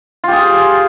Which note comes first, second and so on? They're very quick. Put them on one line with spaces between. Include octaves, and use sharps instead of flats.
F4 G4 G#4